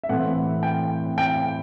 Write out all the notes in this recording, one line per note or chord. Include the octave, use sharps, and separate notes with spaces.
E5
A2 E3 A3 C4 F#5
G5
G5